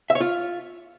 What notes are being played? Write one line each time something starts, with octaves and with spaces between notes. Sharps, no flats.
E5
C#5
F4